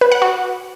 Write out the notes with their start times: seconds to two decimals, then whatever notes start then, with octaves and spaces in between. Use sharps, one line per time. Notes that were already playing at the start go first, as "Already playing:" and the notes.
0.01 B4
0.12 F#5
0.22 F#4